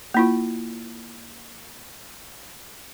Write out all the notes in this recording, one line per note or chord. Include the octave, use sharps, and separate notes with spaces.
A#3 E4 F4